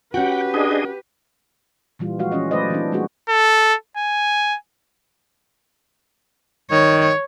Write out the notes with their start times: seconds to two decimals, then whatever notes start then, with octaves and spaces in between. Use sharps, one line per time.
0.14 C#4 F#4 G4 B4 F#5 G5
0.54 D4 G#4 D#5
1.99 A#2 E3 G3 F4
2.19 F3 G#3 F#4 F5
2.32 E3 C#4 F4 D#5
2.51 F#3 A3 B4 C5 D5 D#5
2.70 E3 A#3 C4 D4
2.92 G3 A3 A#3 D4 F#4 G#4
3.29 A4
3.97 G#5
6.71 D#3 C#5